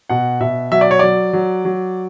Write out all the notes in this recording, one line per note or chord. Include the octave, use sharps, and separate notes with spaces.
B2 F#5
B2 E5
F#3 E5
D5
C#5
F#3 D5
F#3
F#3